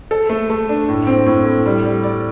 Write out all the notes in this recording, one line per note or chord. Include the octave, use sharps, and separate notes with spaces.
A4
A3
A3
D4
A2
C4
A2
A2
G3
G3
D5